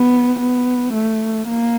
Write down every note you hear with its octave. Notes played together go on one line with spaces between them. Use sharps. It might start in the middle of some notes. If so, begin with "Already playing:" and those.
Already playing: B3
B3
A3
A#3